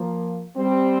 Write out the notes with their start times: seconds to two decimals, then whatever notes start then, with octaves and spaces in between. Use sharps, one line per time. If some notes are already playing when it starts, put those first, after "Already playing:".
Already playing: F3 A#3
0.57 G3 C4